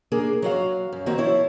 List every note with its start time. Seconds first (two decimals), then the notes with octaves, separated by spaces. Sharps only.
0.12 A#3 D4 G#4
0.42 F#3 F#4 F5
0.92 F#2
1.06 D#3 A#3 C4 F#4
1.18 F3 E4 C#5